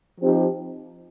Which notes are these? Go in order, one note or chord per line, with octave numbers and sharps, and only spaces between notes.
F3 C4 D#4 G4